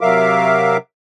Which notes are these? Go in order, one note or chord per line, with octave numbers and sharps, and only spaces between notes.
C3 F#3 A#4 E5 F5 D6